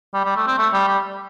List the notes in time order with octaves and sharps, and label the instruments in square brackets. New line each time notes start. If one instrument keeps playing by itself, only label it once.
[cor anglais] G3
G3
A3
C4
A3
G3
G3